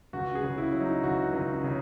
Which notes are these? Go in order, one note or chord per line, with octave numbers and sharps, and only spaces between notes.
C#2 F#4
G#4
C#3
E4
F#3
D#4
C#2 F#4
C#2
C#3